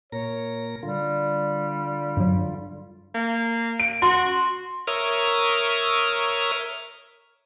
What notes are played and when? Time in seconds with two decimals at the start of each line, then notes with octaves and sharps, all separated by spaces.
0.12 A#2 A#4 C#5 A#6
0.83 D3 G3 F4
2.17 G2 F#3
3.14 A#3
3.80 D7
4.02 F#4 C6
4.87 A#4 C#5 E5 D#6 F6